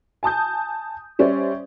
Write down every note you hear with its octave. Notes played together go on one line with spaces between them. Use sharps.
G#5 A5 D#6 G6
G3 C#4 G4 C5 D5 E5